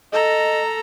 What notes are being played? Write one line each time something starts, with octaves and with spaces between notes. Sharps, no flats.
A4 D#5 A#5